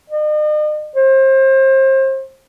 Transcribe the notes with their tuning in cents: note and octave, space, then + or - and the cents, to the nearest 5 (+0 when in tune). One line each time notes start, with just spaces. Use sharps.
D#5 -45
C5 +30